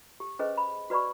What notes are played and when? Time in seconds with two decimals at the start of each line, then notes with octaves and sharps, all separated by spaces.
0.20 G4
0.39 C#4 G#4 B4 C5 D#5
0.57 B5
0.90 F#4 B4 D5 B5 C#6